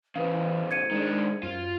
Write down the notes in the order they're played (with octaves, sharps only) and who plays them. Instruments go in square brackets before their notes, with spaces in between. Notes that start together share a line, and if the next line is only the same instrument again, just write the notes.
[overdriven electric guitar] A2 C#3 [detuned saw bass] E3 [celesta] B4 F5 [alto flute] C5
[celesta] G#6 C#7 D#7
[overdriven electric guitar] D#3 D4 [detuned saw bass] G#3
[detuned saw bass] F#2 [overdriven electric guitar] F4